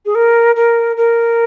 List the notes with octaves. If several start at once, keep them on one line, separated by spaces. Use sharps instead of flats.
G#4
A#4
A#4
A#4